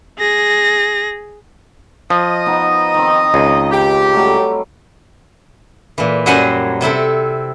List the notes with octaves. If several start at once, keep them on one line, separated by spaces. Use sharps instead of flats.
G#4 A#6
F3 D#5
B3 D#4 B4
D#3 C4
C#2
G4
F#3 G3 A3
A#2 E3
F#2 F#3 G3 C5 F#5 G#5
C3 C4 E4 A4